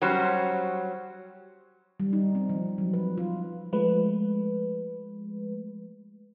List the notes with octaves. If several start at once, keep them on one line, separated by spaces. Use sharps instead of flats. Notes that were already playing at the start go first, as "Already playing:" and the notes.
F#3 G3 C#4 C5
G3
D#4
C4
F3
F#3
B4
F4
F3 G#3 A3 B4